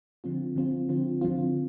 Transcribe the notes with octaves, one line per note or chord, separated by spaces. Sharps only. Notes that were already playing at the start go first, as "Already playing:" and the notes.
D3 F3 C4 F4
D3 F3 C4 F4
D3 F3 C4 F4
D3 F3 C4 F4